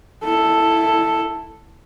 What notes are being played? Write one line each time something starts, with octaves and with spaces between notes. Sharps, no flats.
E4 A4